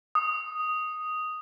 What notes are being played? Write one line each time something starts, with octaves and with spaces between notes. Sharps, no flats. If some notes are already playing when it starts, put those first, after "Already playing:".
D#6